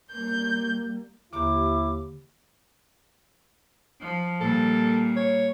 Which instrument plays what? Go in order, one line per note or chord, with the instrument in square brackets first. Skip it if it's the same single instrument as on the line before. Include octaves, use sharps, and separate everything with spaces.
[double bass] G3 A#3 [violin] G6
[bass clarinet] D#2 [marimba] D3 A#3 G4 [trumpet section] E4 [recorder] D6
[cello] F3
[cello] A#2 G3 [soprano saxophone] A4
[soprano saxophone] C#5